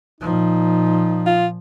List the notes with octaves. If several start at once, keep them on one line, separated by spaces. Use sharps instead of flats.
A#2 F3 D#4
F4